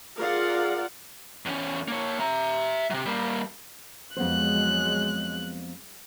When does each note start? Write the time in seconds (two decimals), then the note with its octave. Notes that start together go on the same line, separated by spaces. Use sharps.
0.17 F4 G#4 A#4 D5 F5 F#5
1.46 E2 C#4
1.88 A#3 C#5
2.20 E5 A#5
2.90 C3 F#3
3.06 G3 A#3
4.17 F2 F#3 G#3 B3 C5 F#6